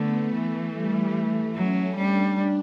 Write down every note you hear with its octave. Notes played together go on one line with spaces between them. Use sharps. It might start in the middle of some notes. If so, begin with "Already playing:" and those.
Already playing: D3 A3 B3
E3 A3
G3
A3
F#3 C#4
G3 D4